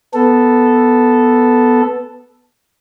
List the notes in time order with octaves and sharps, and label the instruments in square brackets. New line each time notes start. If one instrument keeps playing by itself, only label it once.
[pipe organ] B3 A4